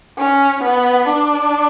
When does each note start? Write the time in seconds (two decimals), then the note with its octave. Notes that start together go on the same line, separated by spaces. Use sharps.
0.18 C#4
0.63 B3
1.08 D4